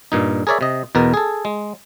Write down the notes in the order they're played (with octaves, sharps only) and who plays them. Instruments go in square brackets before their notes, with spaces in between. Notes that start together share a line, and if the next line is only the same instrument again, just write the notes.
[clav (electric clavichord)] G2 A#2 D#4
G#4 A#4 C#5 D5 E5
C3 D#5
E2 B2 A#4
G#4 A4
G#3